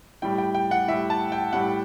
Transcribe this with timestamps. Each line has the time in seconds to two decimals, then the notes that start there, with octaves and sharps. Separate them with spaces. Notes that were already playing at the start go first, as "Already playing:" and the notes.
0.22 A2 G3 G5
0.38 G5
0.55 G5
0.71 F#5
0.88 A2 G3 E5
1.10 A5
1.32 G5
1.53 A2 G3 F#5